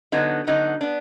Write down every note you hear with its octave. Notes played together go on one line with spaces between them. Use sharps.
D3 F#3 B3 D#4
D3 F#3 B3 D#4
B3 D4